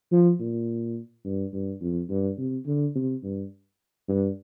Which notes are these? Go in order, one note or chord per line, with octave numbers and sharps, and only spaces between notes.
F3
A#2
G2
G2
F2
G2
C3
D3
C3
G2
G2